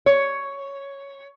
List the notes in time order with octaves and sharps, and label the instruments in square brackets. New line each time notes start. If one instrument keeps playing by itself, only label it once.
[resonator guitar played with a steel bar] C#5